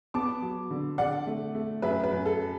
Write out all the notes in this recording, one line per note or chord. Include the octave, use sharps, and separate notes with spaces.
B3 A5 D6
F#3
D3
D3 D5 F#5
A3
A3
F#2 B4 E5
B4
F#2
A4